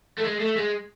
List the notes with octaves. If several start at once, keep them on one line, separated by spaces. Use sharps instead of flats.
A3
G#3
A3
G#3